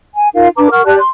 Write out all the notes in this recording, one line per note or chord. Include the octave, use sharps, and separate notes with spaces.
G#5
D#4 F4 A#4 F5
D4 B4 A#5 D6
A#4 F#5 C#6 F6
G4 D5 A5 F#6
C6